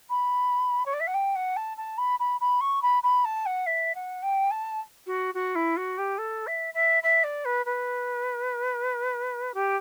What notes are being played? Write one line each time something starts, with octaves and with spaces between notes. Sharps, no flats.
B5
C#5
D5
E5
F#5
G5
F#5
A5
A5
B5
B5
B5
C#6
B5
B5
A5
F#5
E5
F#5
G5
A5
F#4
F#4
E4
F#4
G4
A4
E5
E5
E5
D5
B4
B4
G4